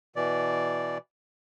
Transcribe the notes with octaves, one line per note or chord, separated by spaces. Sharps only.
B2 E3 D5